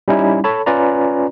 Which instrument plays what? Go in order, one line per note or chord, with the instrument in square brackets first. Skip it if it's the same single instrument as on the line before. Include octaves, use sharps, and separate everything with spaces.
[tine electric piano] G3 C#4 D#4 E4
A4 C#5 A5 B5
C#4 F4 B4 D5 A#5